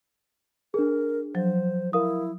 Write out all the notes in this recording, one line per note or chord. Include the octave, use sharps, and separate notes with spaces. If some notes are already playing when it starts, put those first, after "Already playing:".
D4 G#4 A#4
F3 F#3 C5
E4 A#4 F5 D#6